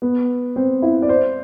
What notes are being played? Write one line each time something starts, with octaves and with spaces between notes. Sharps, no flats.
B3
C4
E4
D5
C5